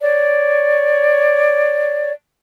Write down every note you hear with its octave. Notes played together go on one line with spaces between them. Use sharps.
C#5 D5